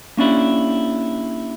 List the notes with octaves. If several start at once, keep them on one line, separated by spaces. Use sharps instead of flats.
A#3 C#4 D4 E4 G4